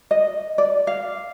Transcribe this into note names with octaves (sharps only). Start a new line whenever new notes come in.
D#5
D5
F5